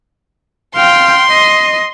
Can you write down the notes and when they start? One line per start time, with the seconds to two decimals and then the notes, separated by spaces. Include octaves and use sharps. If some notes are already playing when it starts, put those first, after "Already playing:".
0.76 F5 G5 C6
1.30 D#5